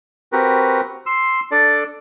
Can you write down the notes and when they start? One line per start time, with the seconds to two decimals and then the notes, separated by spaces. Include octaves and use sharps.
0.32 C4 F#4 G4 A#4 B4
1.06 C6 E6
1.51 D4 A4 D5